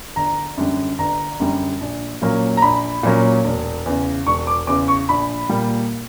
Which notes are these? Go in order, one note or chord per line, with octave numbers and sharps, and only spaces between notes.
G1 A#5
F#2 D3 G3
G1 A#5
F#2 D3 G3
A#1
A#2 F#3 A#3 C#4
A#5
A#1 B5
A#2 F#3 A#3 C#4
E1
E2 C#3
E1 C#6
D6
E2 C#3 D6
C#6
A#1 B5
A#2 G3 A#3